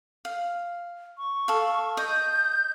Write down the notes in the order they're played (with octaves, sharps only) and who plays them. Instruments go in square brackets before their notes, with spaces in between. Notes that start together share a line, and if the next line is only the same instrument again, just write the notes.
[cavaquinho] F5
[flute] C#6
[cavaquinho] A4 F5
[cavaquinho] D#5 [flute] G6